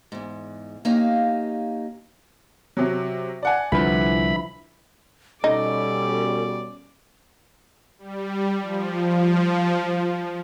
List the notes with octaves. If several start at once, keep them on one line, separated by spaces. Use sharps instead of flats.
E2 G#2
A#3 C#4 D#4 G4 F5
C3 F#3
D5 F#5 G#5
C2 D3 F3 E4 B4 B5
B2 G3 C#4 D#4 A4 D5
G3
F3